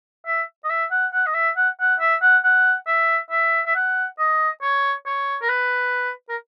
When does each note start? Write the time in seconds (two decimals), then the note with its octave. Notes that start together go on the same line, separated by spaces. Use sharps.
0.26 E5
0.64 D#5
0.70 E5
0.91 F#5
1.13 F#5
1.26 D#5
1.34 E5
1.57 F#5
1.81 F#5
2.00 E5
2.22 F#5
2.44 F#5
2.87 E5
3.30 E5
3.66 E5
3.75 F#5
4.19 D#5
4.62 C#5
5.06 C#5
5.42 A#4
5.49 B4
6.29 A#4